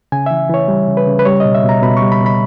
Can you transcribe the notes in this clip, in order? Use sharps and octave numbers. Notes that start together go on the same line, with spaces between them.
C#3 G#5
E3 E5
E3 C#5
G3
C#3
B4
C#3
B4
G3 C#5
B2 D#5
E5
B2
A#5
B2 B5
C#6
G3
B5
B2
B5